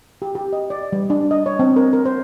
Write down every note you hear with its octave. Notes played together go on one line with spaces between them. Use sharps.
G4
G4
D#5
D5
G3
D4
D#5
C#5
C4
A#4
A#4
C5